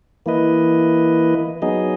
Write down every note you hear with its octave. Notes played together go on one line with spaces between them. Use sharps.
E3 A#3 E4 B4 D#5
F#3 B3 D#4 G#4 D#5